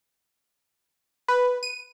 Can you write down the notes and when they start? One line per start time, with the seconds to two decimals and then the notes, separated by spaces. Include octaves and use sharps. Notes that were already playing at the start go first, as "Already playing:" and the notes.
1.28 B4
1.63 D#7